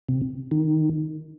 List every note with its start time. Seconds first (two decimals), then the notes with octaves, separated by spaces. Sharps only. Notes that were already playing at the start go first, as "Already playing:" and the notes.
0.09 C3
0.51 D#3